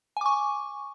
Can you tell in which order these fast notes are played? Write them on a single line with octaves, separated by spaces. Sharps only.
G#5 D6 C#6